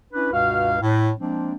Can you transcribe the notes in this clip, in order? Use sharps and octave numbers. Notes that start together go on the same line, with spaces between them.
C#4 D4 E4 B4
C#2 G2 B2 F#4 F5
A2
F3 G#3 A#3 C4 D4